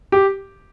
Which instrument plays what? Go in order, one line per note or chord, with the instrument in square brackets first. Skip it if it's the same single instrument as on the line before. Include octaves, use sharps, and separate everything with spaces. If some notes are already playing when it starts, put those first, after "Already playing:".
[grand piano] G4